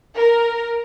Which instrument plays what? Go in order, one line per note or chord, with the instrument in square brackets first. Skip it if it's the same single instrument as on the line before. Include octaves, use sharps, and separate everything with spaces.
[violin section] A#4